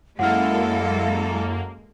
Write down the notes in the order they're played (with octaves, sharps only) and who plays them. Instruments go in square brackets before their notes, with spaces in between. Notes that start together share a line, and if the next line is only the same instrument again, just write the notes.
[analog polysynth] F#2 A#3 [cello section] G#3 A4 [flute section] E4 F5 [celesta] F#5 F6